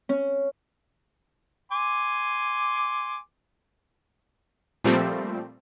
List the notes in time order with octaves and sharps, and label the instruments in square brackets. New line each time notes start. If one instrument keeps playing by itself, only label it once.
[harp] C#4
[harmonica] G#5 C6 D6
[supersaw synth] A#2 F3 G3 A3 C4